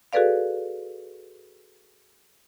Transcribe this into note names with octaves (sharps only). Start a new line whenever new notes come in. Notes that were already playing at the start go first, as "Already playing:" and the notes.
F#4 G#4 A4 B4 D5 F5